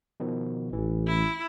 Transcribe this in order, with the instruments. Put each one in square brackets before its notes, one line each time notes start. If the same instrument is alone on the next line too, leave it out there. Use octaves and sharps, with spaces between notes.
[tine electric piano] B2 D#3 F3
[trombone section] A1 [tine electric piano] E3
[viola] E4